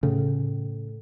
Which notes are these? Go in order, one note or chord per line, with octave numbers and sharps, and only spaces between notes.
A2 C#3